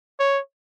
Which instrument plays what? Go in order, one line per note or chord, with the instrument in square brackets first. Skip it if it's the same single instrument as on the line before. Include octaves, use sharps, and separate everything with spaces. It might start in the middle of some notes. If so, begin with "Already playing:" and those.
[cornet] C#5